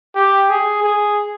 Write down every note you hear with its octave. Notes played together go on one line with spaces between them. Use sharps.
G4
G#4
G#4